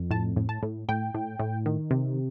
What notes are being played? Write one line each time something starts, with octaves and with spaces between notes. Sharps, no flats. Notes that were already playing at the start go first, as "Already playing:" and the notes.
Already playing: F2
A2 A5
A2
A5
A2
A2 G5
A2
A2
D#3
C3